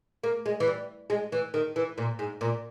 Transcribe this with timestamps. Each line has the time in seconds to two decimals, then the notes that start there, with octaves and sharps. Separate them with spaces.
0.24 A#3
0.46 G#3
0.60 E3
0.67 G3
1.10 G#3
1.32 E3
1.54 D#3
1.76 E3
1.98 A#2
2.19 G#2
2.41 A#2